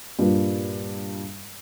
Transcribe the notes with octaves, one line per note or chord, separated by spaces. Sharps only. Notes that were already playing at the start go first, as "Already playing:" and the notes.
G2 A#2